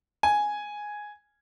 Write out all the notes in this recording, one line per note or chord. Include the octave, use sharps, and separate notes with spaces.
G#5